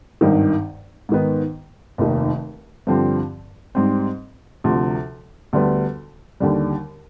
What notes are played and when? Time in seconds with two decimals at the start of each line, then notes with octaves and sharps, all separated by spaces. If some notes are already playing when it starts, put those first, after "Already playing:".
0.21 G#1 G2 D#3
1.09 G#2 D#3 B3
1.98 F1 D#2 D#3
2.87 G2 D3 F3 C4 G4
3.75 G#2 G3 C4
4.64 D2 C3 F3
5.53 D2 D3 G3 B3
6.40 D#2 D3 G3